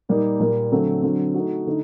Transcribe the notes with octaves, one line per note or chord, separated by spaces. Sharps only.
A#2 G3 A#3 D#4
A#2 G3 A#3
D3 F#3 A3 C4
D3 F#3 C4 F#4
A3 D#4 F#4
D3 A3 D#4